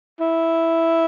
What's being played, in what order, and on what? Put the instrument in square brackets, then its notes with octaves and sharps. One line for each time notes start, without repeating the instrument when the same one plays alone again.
[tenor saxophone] E4